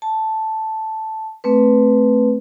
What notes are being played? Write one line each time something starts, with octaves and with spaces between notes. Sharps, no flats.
A5
A3 C4 B4